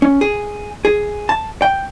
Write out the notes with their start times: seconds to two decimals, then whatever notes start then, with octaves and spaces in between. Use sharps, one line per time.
0.02 C#4
0.21 G#4
0.85 G#4
1.29 A5
1.62 G5